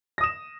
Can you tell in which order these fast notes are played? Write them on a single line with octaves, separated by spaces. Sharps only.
A#6 D#6 E7